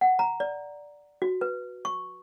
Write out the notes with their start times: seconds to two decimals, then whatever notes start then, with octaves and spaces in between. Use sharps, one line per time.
0.01 F#5
0.19 A#5
0.40 D5
1.22 F#4
1.41 B4
1.85 C#6